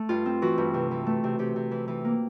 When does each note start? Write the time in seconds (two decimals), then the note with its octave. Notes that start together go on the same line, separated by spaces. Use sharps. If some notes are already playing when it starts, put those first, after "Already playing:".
Already playing: A3
0.09 G2 F4
0.26 C4
0.42 E3 F#4
0.58 G2
0.74 C3
0.91 E3
1.06 A3
1.24 C3
1.39 C3 G4
1.56 C3
1.71 E3
1.88 E3
2.05 A#3